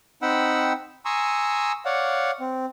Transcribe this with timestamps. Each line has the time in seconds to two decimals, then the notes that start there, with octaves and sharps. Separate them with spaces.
0.22 C4 D#4 F#5 G5 B5 E6
1.05 G#5 A#5 C6 C#6 D#6 E6
1.86 C#5 D5 F5 F#5
2.40 C4